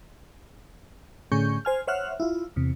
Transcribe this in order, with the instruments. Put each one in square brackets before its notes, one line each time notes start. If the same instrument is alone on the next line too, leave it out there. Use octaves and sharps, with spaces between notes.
[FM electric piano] A2 D3 C#4 G#4 C#6 G6
C5 G#5 F6
C5 C#5 E5 F#5 F6 F#6
E4 F4
E2 C3